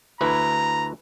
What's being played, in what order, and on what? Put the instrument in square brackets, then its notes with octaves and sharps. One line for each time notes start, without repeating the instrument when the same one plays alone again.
[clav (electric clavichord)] D2 E4 B4 [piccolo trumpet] A#5